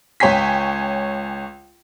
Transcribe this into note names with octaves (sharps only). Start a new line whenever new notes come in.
C#2 C#5 G5 G#5 B6